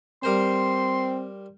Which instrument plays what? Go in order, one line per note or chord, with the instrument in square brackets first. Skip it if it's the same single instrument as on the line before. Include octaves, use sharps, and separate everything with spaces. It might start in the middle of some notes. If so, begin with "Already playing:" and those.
[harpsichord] G3 A#4 C5 [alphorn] C4 [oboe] C6